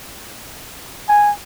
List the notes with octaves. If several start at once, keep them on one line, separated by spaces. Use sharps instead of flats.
G#5